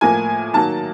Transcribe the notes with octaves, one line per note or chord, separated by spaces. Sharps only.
A2 F3 A#3 G#5
D#3 F#3 A#3 A5